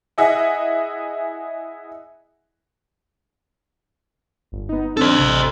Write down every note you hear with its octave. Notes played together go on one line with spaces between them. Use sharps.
E4 G#4 D#5 E5 F#5 G#5
G1
B3 D#4
C4 D4 A4 C5
A1 C3